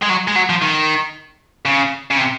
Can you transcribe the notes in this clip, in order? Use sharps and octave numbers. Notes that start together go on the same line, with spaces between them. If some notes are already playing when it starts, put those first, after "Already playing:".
G#3
F#3
G#3
F#3
F3
D#3
C#3
C#3
C3